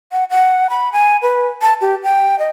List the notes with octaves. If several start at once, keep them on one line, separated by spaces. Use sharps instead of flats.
F#5
F#5
B5
G#5
B4
A5
G4
G5
D#5